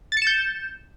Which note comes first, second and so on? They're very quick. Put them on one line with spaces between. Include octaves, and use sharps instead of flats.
A6 C#7 E7 G6